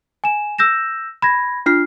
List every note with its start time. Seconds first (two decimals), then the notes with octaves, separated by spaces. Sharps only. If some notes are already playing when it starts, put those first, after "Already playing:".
0.24 G#5 E7
0.58 E6 G6 A#6 E7
1.22 B5 G#6 A#6
1.66 D4 F4 F6 C7